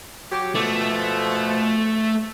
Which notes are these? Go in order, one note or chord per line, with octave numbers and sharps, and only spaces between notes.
F#3 G4
B2 F3 A3